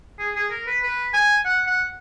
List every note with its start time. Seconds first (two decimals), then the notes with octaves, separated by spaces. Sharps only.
0.19 G#4
0.35 G#4
0.51 A#4
0.67 B4
0.83 B4
1.13 G#5
1.45 F#5
1.67 F#5